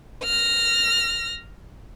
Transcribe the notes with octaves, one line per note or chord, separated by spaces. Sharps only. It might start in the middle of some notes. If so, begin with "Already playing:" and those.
F6 A#6